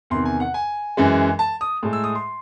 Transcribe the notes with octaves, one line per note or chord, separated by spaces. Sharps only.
E2 C3 D#3 C6
G#5
F#5
G#5
F#2 E3 G#3
A5
D#6
A2 G#3
E6
D#6
C6